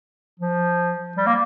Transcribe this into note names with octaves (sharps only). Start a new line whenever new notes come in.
F3
G3
A#3